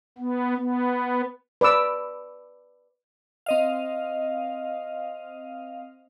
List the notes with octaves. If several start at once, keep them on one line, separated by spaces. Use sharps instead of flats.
B3
B3
B4 D5 D6 E6
C4 D#5 F5